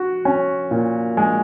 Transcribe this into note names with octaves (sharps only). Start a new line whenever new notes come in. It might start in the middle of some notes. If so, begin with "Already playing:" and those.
Already playing: F#4
C#4
A#2
G#3